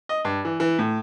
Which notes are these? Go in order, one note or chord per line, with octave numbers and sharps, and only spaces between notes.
D#5
G2
E3
E3
A2